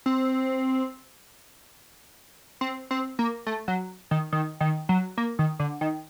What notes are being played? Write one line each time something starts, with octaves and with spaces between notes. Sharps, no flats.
C4
C4
C4
A#3
A3
F#3
D#3
D#3
D#3
F#3
A#3
D#3
D3
D#3